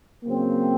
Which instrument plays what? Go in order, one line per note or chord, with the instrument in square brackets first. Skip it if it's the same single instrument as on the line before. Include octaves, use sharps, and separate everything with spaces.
[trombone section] C#3 F#3 C4 [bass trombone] A#3